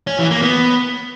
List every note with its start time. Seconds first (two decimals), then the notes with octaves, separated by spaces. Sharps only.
0.07 C#4
0.19 E3
0.30 A#3
0.42 B3